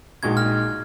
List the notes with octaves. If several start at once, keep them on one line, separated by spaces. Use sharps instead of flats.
A#1 A#2 G#3 D#4 F#4 G#6
F6